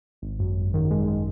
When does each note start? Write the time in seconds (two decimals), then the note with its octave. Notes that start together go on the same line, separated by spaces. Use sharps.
0.22 G#1
0.39 F#2
0.56 G#1
0.74 D#3
0.91 G#3
1.07 G#3